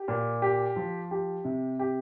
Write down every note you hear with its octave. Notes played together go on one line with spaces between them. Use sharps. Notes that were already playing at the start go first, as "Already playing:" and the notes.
Already playing: G4
A#2
G4
F3
G4
C3
G4